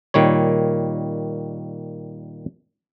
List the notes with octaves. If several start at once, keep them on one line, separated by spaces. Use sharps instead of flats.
A#2 D#3 G3 C#5